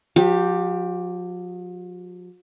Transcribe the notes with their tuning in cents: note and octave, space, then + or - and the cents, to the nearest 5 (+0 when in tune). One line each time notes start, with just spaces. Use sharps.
F3 +45 G4 +0